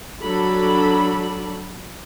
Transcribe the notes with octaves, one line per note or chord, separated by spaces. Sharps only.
F#3 D4 A4 B5